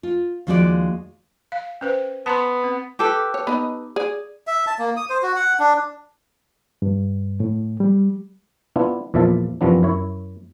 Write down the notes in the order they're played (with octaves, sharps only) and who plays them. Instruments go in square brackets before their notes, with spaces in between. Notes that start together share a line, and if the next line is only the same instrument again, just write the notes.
[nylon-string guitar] F4
D#2 F3 G#3 F#4 B4 D5
[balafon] F5
C#4 B4 C5
[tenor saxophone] B3 [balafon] A5 A#5 C6
[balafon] C4
[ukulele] G4 A4 B4
[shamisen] C#5
B3 D#4 D#5
G#4 D5
[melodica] E5
A5
A#3
D#6
C5
F#4
F#5
D4
[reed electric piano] G2
A2
G3
[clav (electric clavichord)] B3 D4 E4 F4
E2 A#2 F3 E5 F5 A5
F#2 C3 E3 F3 B3 D4
F#2 E4 C#5